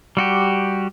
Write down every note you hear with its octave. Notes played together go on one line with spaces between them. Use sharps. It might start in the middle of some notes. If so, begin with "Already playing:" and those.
G3 F#4 G4